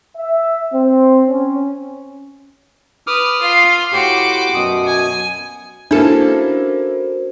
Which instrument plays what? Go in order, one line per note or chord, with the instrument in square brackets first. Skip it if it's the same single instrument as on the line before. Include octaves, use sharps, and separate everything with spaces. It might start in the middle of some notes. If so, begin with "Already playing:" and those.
[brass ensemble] E5
C4
C#4
[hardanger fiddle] B4 [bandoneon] D6 D#6 F6
[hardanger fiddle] F4 F5
[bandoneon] A2 G4 C6 [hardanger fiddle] F#4 D6
[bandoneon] F#2 B2 D#6
[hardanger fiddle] G#5
[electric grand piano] A#3 E4 [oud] C#4 A4 [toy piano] D4 [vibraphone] F#4 A#4 C5